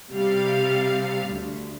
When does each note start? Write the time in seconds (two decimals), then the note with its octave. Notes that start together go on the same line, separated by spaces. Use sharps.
0.12 C3 G3 F5
1.29 D2